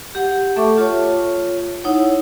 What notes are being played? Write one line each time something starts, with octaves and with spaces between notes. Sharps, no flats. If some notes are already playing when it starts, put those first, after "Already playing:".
G4 F#5
A3 A4 E5 A5 C#6 D6
F4 C#5
D#4 E4 C#5 F#5